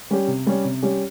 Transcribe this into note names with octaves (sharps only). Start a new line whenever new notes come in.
G3 C#4 G4
C3
G3 C#4 G4
C3
G3 C#4 G4